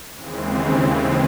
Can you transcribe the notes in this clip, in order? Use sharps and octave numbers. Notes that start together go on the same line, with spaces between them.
D#2 C#3 E3 G#3 C4